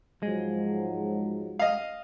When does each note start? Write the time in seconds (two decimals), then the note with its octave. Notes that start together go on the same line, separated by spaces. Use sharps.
0.23 G#2 F3 F#3 G#3
1.59 D#5 F5